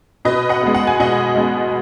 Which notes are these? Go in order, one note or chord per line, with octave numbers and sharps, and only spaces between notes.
B2 B4 D#5
D#5 F#5
G#3 B3
F#5
G#5
B2 D#5 F#5
G#3 B3